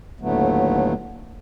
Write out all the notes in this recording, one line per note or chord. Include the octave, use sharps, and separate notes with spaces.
D#2 A2 D3 F#3 A3 B3